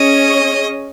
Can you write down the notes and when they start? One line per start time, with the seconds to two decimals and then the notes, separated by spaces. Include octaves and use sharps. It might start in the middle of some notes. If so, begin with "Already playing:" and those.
Already playing: C#4 G#4 C#5 D#5